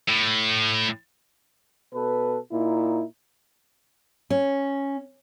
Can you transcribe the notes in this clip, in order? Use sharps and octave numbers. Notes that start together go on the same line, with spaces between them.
A2
B2 A4 B4
A#2 D#4 E4
C#4